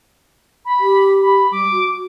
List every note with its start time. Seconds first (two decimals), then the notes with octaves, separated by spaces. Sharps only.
0.65 B5
0.80 G4
1.22 B5
1.52 G3 D6
1.71 F#4